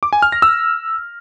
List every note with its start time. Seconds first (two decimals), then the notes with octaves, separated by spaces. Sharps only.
0.03 D6
0.13 G#5
0.22 F6
0.32 A#6
0.42 E6